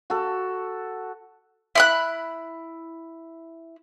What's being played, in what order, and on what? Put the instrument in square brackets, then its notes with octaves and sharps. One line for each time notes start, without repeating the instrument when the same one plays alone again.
[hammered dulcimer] F#4 A4
[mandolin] E4 B5 F#6